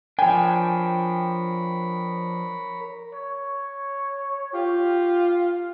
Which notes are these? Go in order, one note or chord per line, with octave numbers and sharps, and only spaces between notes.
F3 D4 A#4 C#5 G5 G#5 B5
C#5
F4 G4